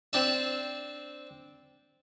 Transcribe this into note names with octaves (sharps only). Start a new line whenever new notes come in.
C4 D4 E5